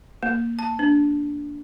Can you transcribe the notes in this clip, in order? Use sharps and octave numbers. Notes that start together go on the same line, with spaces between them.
A#3
A5
D4